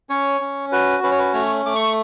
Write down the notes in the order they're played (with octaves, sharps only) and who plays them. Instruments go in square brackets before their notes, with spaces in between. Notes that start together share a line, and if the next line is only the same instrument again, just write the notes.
[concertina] C#4 C#5
C#4
F#4 B4
C#4 B4
C#5
B4
A3 C#5
A3 D6
C#6